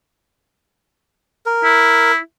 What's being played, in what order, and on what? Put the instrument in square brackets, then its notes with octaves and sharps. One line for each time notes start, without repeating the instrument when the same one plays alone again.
[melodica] A#4
[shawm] E4